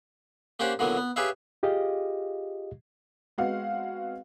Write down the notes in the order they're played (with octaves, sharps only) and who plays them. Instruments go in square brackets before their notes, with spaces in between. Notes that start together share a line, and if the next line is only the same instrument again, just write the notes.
[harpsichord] A#3 C#4 G4 C5 D5 F#5
A#2 D3 E3 F#3 A#3 B3
B3
G4 G#4 B4 C#5 E5 F5
[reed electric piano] F4 G4 G#4 D#5 F5
[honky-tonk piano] G#3 B3 C4 F#4 F5 F#5